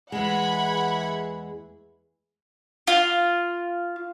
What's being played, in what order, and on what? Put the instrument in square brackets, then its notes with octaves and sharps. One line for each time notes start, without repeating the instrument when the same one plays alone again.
[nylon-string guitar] E2 G#3 [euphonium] E3 [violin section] F#5 B5 G#6
[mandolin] F4